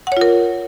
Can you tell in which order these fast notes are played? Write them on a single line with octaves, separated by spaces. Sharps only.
F#5 C#5 F4 A#4